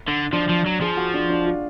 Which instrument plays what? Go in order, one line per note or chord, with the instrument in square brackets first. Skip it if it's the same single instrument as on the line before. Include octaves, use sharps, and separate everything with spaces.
[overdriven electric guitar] D3
[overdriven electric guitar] F3 [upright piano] D4
[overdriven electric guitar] F3
F#3
[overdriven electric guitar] F3 [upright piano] G#4
[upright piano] F#4
D4
D4
F4